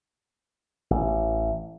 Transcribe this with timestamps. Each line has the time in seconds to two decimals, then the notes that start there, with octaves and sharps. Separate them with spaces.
0.91 A1